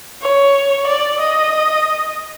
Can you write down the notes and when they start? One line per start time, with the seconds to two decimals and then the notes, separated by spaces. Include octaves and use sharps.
0.22 C#5
0.87 D5
1.21 D#5